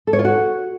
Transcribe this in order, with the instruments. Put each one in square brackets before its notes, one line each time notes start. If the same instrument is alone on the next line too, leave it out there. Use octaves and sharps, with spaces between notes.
[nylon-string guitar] A4
C#5
F4
F#4